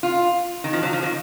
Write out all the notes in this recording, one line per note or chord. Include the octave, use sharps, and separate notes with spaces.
F4
D#3
F3
F#3
F3
D#3